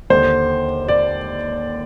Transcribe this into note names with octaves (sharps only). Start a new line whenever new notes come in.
D#2 D3 C5
D5